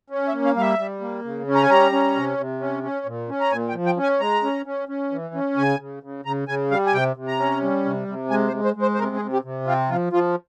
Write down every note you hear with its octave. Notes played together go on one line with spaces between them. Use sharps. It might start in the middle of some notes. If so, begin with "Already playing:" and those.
C#4
E5
A#3
F5
G3 F5
E5
G3
A#3
C#3
C#4
A#5
G#5
G3 A#5
C#4
C3
C3
C#4
C#4
A#2
C#4
A#5
A#2 G#5
G5
F3
G5
C#4
G#5
G#3 A#5
C#4
C#4
C#4
E3
C#4
C#3 G#5
C#3
C#3
C#3 A#5
C#3 G#5
G3 F5
G#5
C3 G5
C3
A#5
C#4
G3
C3
C3
G#3 G#5
C5
G#3
C5
G#3
C5
C5
C3 A#4
G#4
C3
G4
C3
C4 F4
F3 F4
F3 F4